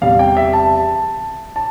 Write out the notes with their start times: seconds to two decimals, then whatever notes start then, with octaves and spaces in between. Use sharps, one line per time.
0.01 E2 C3 G3 F5
0.19 G5
0.37 E5
0.53 A5
1.56 A5